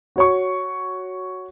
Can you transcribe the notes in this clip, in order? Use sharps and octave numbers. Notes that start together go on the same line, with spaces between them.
F#4 C#5 C#6